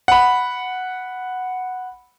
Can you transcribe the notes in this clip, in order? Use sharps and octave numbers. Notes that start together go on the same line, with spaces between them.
F#5 B5